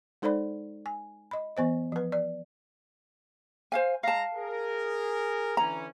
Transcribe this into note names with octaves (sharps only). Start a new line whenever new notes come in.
G#3 D#4 A4 C5 D5 B5
G#5
D#5 B5
E3 B3 C5 D#5
F3 B4
D5
C5 F5 G#5
G#3 F5 A5 A#5
G#4 A#4
D3 E3 C#4 A#5